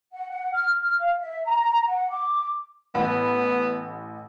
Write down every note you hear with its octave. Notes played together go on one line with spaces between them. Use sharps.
F#5
F#5
F6
F6
F5
E5
A#5
F#5
D6
A1 B3 F#5 B5